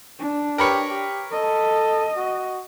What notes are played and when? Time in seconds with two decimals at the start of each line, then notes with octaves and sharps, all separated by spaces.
0.19 D4
0.58 G4 A#4 B4 C#5
0.90 G4
1.31 A4 D#5
2.17 F#4